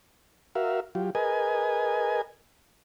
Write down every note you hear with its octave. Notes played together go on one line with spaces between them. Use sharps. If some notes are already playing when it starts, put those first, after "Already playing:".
F#4 A#4 E5 F5
F#3 F4 G4
G#4 A#4 B4 D#5 G#5